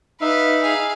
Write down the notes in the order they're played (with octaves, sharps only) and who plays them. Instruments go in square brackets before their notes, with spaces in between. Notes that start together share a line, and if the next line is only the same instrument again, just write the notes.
[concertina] D#4 E5 [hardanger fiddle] B4 F5
[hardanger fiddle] G#4 F5